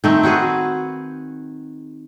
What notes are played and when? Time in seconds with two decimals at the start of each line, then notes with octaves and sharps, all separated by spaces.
0.04 D#3 A3 C4
0.23 C4 F#4 G#4 B4